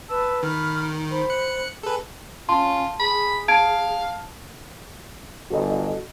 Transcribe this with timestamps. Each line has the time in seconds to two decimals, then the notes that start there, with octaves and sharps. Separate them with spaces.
0.09 B4 A5 E6
0.43 D#3 B5 F6
1.11 C5 B5
1.30 F#6 C#7
1.83 G#4 A4 B4
2.49 C#4 F4 A5 C6
3.00 G#4 B5
3.48 F5 A5 G#6 D7
5.50 G1 F#4 A4 D#5